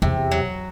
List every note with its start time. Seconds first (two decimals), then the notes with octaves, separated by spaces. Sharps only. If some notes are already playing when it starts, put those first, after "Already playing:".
0.02 E2 C3
0.31 F#3